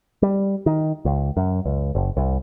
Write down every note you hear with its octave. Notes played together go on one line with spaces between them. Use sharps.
G3
D#3
C#2
F#2
C#2
F#1
C2